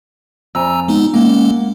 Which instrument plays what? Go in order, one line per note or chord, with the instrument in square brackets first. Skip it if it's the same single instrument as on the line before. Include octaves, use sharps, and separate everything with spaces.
[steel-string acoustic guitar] F2 [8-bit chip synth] G#5 A#5 E6
[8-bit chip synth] G#3 B3 D#4
[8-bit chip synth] G#3 C#4 [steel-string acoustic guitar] A#3 F#5